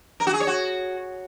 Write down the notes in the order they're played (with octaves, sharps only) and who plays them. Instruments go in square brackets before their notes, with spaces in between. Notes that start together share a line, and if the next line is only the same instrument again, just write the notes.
[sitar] A#4
F#4
G#4
C#5
F#4